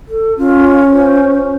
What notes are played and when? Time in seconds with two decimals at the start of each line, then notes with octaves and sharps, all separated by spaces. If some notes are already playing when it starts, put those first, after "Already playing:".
0.08 A4
0.38 C#4 F4
0.88 C5